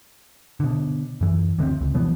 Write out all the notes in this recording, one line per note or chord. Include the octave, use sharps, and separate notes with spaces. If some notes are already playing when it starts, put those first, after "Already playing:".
B2 D3
F#2 E3
D2 D3 G3 C4
C#2
B2 E3 F3 B3